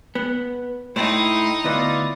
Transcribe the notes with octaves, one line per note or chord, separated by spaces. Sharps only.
B3
A2 D#4 E4 G5 C6
D2 B3 E4 F4 D5